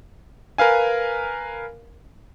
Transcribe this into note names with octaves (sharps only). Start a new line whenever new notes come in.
A#4 B4 F5 G#5